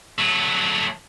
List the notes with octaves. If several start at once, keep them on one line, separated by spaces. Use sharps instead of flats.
F#3 A3